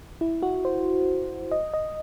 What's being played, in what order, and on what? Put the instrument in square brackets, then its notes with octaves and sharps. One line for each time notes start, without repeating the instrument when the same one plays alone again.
[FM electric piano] E4
F#4
C5
D#5
D#5